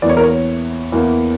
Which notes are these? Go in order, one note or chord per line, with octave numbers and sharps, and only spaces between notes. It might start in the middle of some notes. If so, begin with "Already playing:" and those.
E2 E3 A#3 D5
C#5
A#4
C#5
E2 E3 A#3